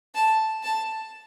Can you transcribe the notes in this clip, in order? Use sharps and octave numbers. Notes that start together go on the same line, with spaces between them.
A5
A5